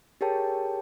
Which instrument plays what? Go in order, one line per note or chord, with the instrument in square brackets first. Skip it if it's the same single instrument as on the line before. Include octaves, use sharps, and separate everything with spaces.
[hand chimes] G4 G#4 A#4 C#5 G5 A5